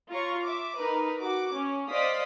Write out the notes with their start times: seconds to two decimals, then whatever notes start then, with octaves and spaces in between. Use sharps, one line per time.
0.10 F4 C#5 A#5 C#6
0.44 E5 D6
0.76 D#4 A#4 B4
1.20 F#4 D6
1.55 C#4
1.90 C5 D5 D#5 F5 D#6 B6